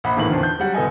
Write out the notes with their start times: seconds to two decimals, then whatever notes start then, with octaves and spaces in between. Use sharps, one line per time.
0.04 A#1 F#5 B5
0.16 A1 D2 D#3 E3 A#3 F#7
0.29 E2 D3 D#3 F3
0.43 G6
0.59 F#3 G3 F#5
0.74 D1 B3 A4 D#5 G#5